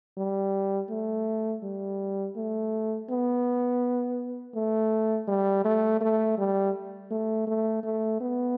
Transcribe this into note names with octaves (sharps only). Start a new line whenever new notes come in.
G3
A3
G3
A3
B3
A3
G3
A3
A3
G3
A3
A3
A3
B3